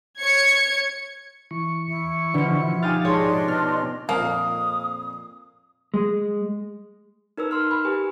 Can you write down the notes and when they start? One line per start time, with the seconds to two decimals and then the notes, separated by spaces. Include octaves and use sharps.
0.20 C#5 G#6 C#7
1.51 E3 C#6
1.87 E2 E4
2.34 B2 D3 F3 D4
2.83 D#4 F4 G4 F5 G#5 D#6 F6 A6
3.05 G#2 D4 G#4 C#5 D#5 C6
3.48 B2 B3 F6
4.09 F2 A#2 A#3 F5 D#6
5.94 G#3
7.37 D#4 A#4 B4 E6
7.51 C6 F6
7.67 A#4 B5
7.85 G4 B4 G#5